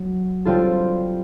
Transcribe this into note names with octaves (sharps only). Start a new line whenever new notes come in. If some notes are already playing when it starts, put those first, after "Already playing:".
Already playing: F#3
G3 C4 F4 A4